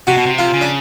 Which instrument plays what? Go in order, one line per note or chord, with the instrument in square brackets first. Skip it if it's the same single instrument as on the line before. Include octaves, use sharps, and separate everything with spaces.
[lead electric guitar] C3 [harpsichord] F#4
[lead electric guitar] B2
C3
[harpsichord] F4
[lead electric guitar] C#3
[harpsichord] D4